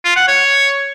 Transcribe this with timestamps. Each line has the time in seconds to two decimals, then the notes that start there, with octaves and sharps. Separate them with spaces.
0.05 F4
0.16 F#5
0.28 C#5